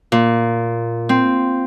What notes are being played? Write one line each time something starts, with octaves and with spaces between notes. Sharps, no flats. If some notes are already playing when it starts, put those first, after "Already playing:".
A#2
C4